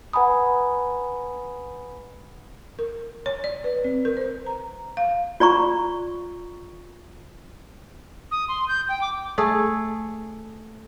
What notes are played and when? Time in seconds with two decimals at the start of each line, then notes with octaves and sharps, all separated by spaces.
0.13 B4 F#5 G#5 A#5 B5 D#6
2.79 A#4
3.26 C#5
3.44 D5
3.64 B4
3.84 C4
4.05 A#4
4.17 C5
4.46 A#5
4.97 F5
5.40 F4 D5 A#5 C#6
8.31 D#6
8.48 C6
8.68 G6
8.89 G5
9.01 D6
9.38 A3 G#4 A4